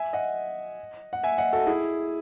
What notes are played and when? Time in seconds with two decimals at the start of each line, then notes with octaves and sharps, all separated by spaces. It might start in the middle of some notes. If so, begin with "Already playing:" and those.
Already playing: E5 G#5
0.13 D#5 F#5
1.13 F#5
1.23 E5 G#5
1.38 D#5 F#5
1.53 F#4 A4
1.67 E4 G#4